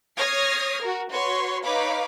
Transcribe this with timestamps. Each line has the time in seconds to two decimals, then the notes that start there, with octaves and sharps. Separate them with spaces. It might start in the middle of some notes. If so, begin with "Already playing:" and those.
0.16 C#5 D#6 F6 G#6 A#6 C7
0.81 F#4 A#4
1.11 F#4 B4 C#5 C6 C#6
1.63 D#4 B4 C#5 F5 B5 D6